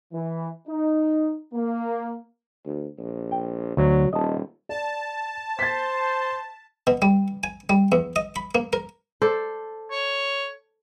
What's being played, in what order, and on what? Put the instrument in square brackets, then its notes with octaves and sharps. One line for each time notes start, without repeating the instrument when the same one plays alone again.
[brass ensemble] E3
D#4
A#3
[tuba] D2
A#1
[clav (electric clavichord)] G5
[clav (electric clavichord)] D2 [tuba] F#3
[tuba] D#1 [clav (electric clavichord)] D#5 A5
[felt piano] D5 [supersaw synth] A5
[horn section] C5 [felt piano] A6 B6
[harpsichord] B2
G3
G#5
G3
E2
D#5
B5
A#3
A#4
[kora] A4 C5 D5
[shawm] C#5